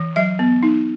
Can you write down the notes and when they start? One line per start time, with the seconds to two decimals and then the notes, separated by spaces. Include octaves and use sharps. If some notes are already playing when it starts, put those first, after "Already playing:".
Already playing: E3
0.16 F#3 E5
0.39 B3
0.63 D#4